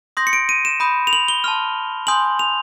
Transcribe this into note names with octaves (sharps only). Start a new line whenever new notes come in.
C6 D#6 G6 A#6
C#7
D7
D#7
E7
B5 D#6 G6
F7
F#7
G7
A5 C6 F6
G#5 C6 D#6 G6 F#7
F7